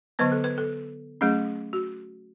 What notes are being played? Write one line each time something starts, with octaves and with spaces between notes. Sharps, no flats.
D3 F#3 B3 B4
A4
B4
A4
F#3 A3 C#4 G#4
F#4